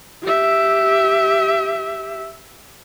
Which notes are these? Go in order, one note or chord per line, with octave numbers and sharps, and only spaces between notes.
G4 E5